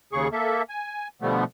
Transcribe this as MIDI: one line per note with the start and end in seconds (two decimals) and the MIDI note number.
0.13 0.28 39
0.13 0.28 49
0.13 0.28 68
0.13 0.28 85
0.32 0.62 58
0.32 0.62 69
0.32 0.62 76
0.69 1.08 80
1.22 1.44 47
1.22 1.44 50
1.22 1.44 53
1.22 1.44 55
1.22 1.44 57
1.22 1.44 59